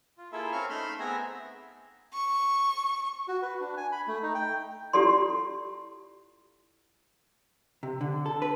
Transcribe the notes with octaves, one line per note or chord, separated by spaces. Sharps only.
F4
A#3 E4 F4 G#4 A4 E5
C4 C#4 F5 C#6 F6
A3 D#4 B5 C6 E6 F6
B3 C4 G#4 E5 G#5 A#5
C#6
F#4
B4
D4
G#5
B5
A3
D#4
G5
E4 F4 G4 A4 D5 C6
C3
D3
A4
B4